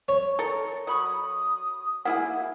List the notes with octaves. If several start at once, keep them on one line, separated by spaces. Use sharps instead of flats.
C#5
A4 A#4
F#3 B5 C#6 D#6
A#3 E4 G#4 F#5